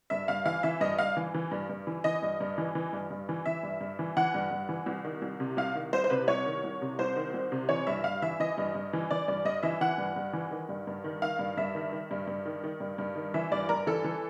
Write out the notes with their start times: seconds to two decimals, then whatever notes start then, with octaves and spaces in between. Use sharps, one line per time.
0.10 G2 E5
0.28 G2 F5
0.45 E3 F5
0.63 E3 E5
0.81 G2 D#5
0.99 G2 F5
1.17 E3
1.34 E3
1.51 G2
1.69 G2
1.87 E3
2.04 E3 D#5
2.22 G2
2.40 G2
2.58 E3
2.75 E3
2.93 G2
3.10 G2
3.29 E3
3.46 E3 E5
3.63 G2
3.81 G2
3.99 E3
4.17 E3 F#5
4.34 G2
4.51 G2
4.69 E3
4.86 C2
5.04 D#3
5.22 C2
5.40 C3
5.57 C2 F5
5.75 D#3
5.93 C2 C5
6.04 C5
6.10 C3 B4
6.28 C2 C#5
6.46 D#3
6.64 C2
6.82 C3
6.99 C2 C5
7.16 D#3
7.34 C2
7.52 C3
7.69 E3 C#5
7.87 G2 E5
8.04 G2 F5
8.22 E3 E5
8.40 E3 D#5
8.58 G2
8.75 G2
8.93 E3
9.11 E3 D5
9.28 G2 D5
9.45 G2 D#5
9.63 E3 E5
9.81 E3 F#5
9.98 G2
10.16 G2
10.33 E3
10.51 D#3
10.69 G2
10.87 G2
11.04 D#3
11.22 D#3 F5
11.39 G2
11.57 G2 E5
11.75 D#3
11.93 D#3
12.11 G2
12.27 G2
12.46 D#3
12.64 D#3
12.80 G2
12.98 G2
13.16 D#3
13.34 E3 E5
13.51 G2 D5
13.69 G2 A#4
13.87 E3 A4
14.04 E3